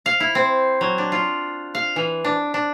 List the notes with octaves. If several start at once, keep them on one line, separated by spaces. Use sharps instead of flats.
F5
E4
C4
F#3
D4
F4
F5
E3
D4
D4